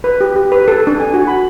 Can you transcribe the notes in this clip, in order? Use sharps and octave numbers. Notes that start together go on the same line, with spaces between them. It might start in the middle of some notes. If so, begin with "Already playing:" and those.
B4
G4
G4
B4
A4
D4
G#5
F#4
B5